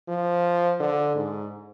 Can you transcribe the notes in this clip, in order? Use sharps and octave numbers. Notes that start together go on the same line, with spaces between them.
F3
D3
G#2